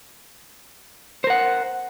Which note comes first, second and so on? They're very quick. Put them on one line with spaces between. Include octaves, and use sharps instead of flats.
C5 A#4 F#5